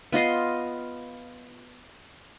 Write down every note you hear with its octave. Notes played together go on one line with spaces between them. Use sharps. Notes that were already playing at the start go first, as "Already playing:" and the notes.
B3 F4 D#5 C6